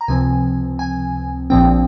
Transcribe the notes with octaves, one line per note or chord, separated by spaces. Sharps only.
A#5
C#2 C3 F3 C4 G#5
G#5
A#1 A#2 F3 C4 G5